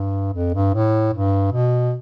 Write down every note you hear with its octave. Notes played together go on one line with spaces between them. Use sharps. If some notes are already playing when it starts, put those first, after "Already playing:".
Already playing: G2
F2
G2
A2
G2
B2